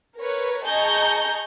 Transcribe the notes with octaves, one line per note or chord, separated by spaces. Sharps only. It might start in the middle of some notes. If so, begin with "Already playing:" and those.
A#4 B4 C#5
G#4 D#5 A5 A#5 C#6 G6